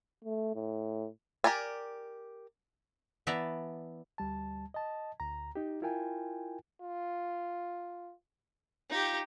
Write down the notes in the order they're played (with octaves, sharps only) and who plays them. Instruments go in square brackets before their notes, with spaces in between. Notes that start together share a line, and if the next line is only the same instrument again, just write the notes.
[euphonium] A3
A2
[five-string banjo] G4 A#4 D5 G#5
[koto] E3 B3 D5 E5 A5 A#5
[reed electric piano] D2 G3 A5
D#5 A5
D2 A#5
D#4 G4
E4 F4 A#4 G5 G#5
[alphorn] F4
[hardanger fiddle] D#4 G4 [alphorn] F4